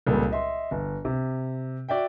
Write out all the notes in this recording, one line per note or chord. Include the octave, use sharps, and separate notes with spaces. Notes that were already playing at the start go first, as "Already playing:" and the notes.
F1 C#2 A#2 G3 A4 A#4
D#5 E5 C6
G1
C3
F#4 D5 E5 G5